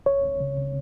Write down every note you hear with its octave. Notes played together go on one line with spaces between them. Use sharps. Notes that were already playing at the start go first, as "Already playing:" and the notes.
C#2 C#5
C#2
C#3
C#3